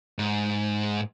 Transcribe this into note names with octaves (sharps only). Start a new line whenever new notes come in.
G#2